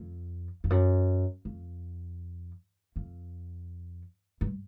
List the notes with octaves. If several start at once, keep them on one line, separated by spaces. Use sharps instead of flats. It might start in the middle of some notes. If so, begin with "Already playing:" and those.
Already playing: F2
F2
F#2
F2
F2
G2